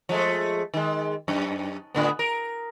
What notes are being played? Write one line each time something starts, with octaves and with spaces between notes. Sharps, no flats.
F3 G#3 A3
D#3 G#3
F#2
A2 D3 B3
A#4